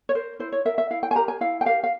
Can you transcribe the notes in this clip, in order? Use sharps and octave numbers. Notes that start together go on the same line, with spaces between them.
C#5
A#4 C5
E4 C5
C#5
A#4 E5
E5
E4 F5
G5
G#5
G4 A#4 A#5
G#5
E4 F5
G5
G4 A#4 F5
F5